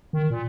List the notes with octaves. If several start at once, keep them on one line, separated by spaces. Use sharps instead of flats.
D#3
A#2